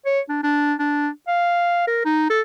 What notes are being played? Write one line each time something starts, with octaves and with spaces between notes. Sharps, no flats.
C#5
D4
D4
D4
F5
A#4
D#4
A4